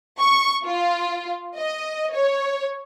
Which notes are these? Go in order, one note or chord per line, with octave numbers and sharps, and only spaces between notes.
C#6
F4
D#5
C#5